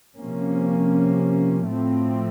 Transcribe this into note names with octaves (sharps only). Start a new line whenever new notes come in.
C3 F3 A#3 C#4
A2 F3 A3 C4